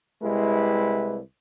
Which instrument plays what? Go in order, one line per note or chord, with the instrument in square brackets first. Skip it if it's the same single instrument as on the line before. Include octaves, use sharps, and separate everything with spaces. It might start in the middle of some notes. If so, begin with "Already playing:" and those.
[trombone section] C2 G#3 E4 G4 B4